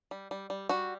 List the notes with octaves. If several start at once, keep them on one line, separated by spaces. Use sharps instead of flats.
G3
G3
G3
G3 F#4